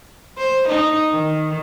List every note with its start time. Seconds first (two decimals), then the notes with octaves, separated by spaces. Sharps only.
0.38 C5
0.69 D#4
1.11 D#3